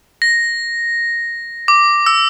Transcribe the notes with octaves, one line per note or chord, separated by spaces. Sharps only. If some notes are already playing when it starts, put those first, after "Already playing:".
A#6
D6
E6